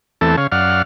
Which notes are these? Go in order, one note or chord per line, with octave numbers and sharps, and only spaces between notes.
E2 E3 A3 C4 A4 A5
C#3 C#5 F5
F#2 D5 F5 F#5 F6